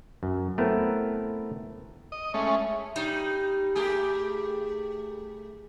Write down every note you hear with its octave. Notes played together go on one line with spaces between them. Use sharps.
F#2
A3 B3 C4 E4 A#4
D#5
G#3 A3 C#4 E5
G3 D#4
A3 G4 G#4